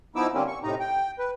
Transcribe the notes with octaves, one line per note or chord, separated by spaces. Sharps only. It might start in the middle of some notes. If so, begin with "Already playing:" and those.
F3 B3 D#4 E4 D6 E6
D3 G3 A#3 C4 C#4
C#6
A2 C3 D#4 A#5
G5
B4